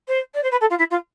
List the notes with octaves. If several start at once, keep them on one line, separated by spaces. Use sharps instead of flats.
C5
D5
C5
B4
A4
F4
E4
F4